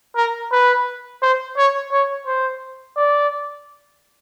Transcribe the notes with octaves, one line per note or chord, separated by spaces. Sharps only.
A#4
B4
C5
C#5
C#5
C5
D5